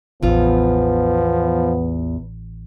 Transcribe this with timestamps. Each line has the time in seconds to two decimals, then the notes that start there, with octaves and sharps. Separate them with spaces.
0.23 A1 E2 F3 B3 F4